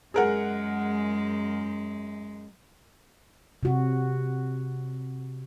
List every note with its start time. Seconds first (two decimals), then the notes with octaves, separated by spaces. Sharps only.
0.14 F#2 G#3 G#4 A#4 F#5
3.63 C3 F#4